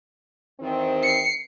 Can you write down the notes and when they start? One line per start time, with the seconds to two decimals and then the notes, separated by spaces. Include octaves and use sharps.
0.60 E2 D#3 C4
1.03 C7 C#7